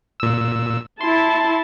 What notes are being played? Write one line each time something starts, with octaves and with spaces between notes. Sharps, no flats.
A#2 E6
E4 A5 C6